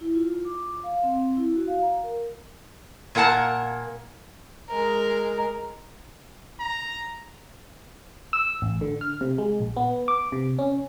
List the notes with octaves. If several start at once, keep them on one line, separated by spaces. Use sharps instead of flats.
E4
F4
D6
F5
C4
C4
E4
F#4
F5
A#5
A#4
A#2 A#3 A#4 F#5 A5
G#3 A#4
A#5
E6
A1
D3
F6
C3
G#3
A#1
B3
D6
C3
C#4